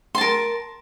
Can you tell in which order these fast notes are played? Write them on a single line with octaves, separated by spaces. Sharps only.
C6 A5 A#4